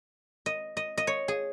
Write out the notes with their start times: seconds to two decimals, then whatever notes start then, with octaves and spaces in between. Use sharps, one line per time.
0.46 D#5
0.77 D#5
0.98 D#5
1.07 C#5
1.28 G#4